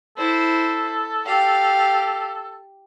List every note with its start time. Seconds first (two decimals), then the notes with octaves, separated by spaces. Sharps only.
0.18 E4 A4 C5
1.25 G4 F5